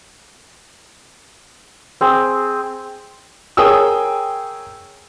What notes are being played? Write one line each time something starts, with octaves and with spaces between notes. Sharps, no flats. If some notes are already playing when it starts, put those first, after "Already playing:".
C4 G#4
G#4 A#4 C#5 G5 D#6 E6